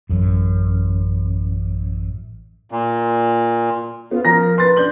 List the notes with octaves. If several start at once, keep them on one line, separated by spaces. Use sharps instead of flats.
A1 F#2
A#2
B3 F4
F3 A#4 A#5 A#6
B4 C6 A6
D4 G6 F#7